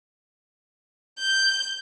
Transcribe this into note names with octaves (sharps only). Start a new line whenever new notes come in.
G6